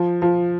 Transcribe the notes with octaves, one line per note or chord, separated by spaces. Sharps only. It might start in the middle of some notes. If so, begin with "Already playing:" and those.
Already playing: F3
F3